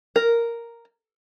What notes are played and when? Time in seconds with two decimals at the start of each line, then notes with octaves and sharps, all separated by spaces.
0.16 A#4